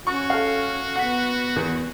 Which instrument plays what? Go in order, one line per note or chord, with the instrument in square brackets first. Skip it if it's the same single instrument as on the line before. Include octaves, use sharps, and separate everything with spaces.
[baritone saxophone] C#4 [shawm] F#4 [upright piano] C#6
[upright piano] A4 F5
[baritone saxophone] B3 [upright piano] F#5 B6
[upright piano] E2